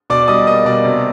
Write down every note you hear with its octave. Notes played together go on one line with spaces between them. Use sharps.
B2 D5 D6
G3 D#5 D#6
A#3 D#5 D#6
B2 D5 D6
C3